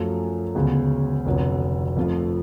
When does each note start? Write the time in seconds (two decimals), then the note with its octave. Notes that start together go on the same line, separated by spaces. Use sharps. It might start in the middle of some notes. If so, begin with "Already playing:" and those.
Already playing: F#2 F3 A3 F4
0.55 D2 C#3 G#3 B3
1.26 F1 F2 D3 F#3
1.97 F2 F3 A3 F4